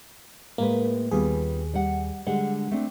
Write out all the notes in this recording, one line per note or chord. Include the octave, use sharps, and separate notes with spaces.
A2 G#3 A#3 B4
D#2 G3 B3 F4 G#4
G3 F#5
D3 G3 G#3 F#5
A3 C4 D4